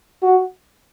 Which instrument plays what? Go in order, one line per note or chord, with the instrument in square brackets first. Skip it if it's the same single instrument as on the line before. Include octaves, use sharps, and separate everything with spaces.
[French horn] F#4